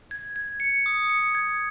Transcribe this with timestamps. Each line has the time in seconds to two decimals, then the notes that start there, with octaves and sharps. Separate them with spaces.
0.11 G#6
0.36 G#6
0.60 C#7
0.86 D#6
1.10 C#7
1.35 G#6